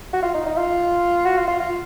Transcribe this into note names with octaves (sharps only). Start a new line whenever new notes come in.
F#4
F4
D#4
D#4
F4
F#4
F4
F4
F4